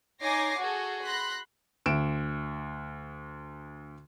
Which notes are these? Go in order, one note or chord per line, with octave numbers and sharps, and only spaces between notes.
D#4 C#5 G#5 D6 A#6 C7
F#4 G#4 A4
B5 C6 F#6 A#6
D2 D7 E7